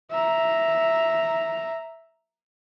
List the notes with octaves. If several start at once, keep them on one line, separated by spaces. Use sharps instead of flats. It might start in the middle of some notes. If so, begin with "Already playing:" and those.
E5 A#5